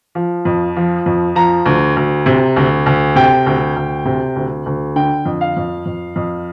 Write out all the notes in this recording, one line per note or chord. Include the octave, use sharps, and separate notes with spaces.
F3
F2
F3
F2
F3 A#5
D2
D2
C3
D2
D2
C3 G5
D2
D2
C3
D2
D2
D3 G5
F2
F5
F2
F2
F2